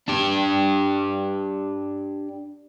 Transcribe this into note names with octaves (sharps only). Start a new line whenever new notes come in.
D4 G4